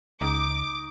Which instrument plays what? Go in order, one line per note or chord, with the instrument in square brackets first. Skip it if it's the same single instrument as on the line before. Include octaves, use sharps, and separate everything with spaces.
[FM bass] C#2 [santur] D#4 [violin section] D6